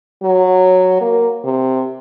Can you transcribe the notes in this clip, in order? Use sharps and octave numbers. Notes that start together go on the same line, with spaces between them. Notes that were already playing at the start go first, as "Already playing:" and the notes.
F#3
A#3
C3